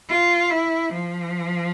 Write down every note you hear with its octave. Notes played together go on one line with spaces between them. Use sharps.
F4
E4
F3